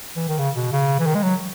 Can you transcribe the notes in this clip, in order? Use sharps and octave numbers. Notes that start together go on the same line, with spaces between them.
E3
D#3
C#3
B2
C#3
E3
D#3
G#3
F#3